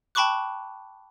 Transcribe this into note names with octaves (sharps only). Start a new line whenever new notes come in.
G5 A5 B5 C#6 D6 F#6